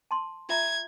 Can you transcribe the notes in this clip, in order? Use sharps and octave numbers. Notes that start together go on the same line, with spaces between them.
A5 C6
F4 E5 A#5 G#6